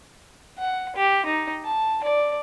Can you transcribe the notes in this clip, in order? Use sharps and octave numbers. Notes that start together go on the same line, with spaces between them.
F#5
G4
D#4
A5
D5